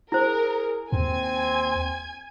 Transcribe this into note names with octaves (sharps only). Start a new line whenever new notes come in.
E4 G#4 A#4 C5
D#2 C4 G#5 G#6